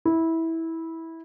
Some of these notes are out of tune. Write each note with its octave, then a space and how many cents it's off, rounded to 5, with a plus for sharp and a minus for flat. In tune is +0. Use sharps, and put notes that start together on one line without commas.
E4 -15